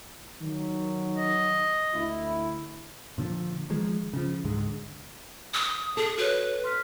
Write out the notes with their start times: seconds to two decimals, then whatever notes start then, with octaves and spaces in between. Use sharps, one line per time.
0.41 D#3 F#3
1.17 D#5
1.94 D2 E4
3.18 A#2 D3 D#3 F3
3.70 D#3 F3 G#3
4.13 C#3 F3
4.44 C#2 G#2 D3 G#3
5.54 D#6
5.97 G#4 A4
6.18 F#4 B4 C#5
6.64 C6 F6 B6